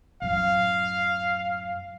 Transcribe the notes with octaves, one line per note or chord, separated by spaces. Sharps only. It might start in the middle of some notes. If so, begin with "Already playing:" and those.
F#2 A2 F5